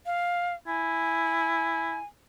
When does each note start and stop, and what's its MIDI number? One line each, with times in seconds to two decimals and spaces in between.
0.06 0.54 77
0.67 1.98 64
0.67 2.06 80